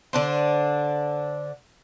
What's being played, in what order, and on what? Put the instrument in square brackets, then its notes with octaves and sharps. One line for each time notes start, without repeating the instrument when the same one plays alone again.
[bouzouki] D3 D4 C5